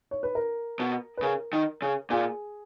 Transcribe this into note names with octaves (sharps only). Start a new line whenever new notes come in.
C#5
B4
A#4
B2
B4
C#3 A#4
D#3
C#3
A#2 G#4